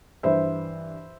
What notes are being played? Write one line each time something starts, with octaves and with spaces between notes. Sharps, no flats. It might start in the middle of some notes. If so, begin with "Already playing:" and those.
G2 E3 C5 E5